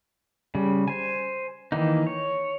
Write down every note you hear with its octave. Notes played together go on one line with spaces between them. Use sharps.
C#3 G3
C5 G#5
D#3 E3 A#3 D#4
C#5